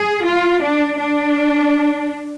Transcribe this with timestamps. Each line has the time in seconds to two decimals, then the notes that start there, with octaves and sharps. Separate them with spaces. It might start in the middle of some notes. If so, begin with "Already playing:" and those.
Already playing: G#4
0.26 F4
0.63 D4
0.99 D4